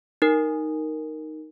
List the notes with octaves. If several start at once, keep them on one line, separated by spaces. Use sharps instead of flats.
D#4 A#4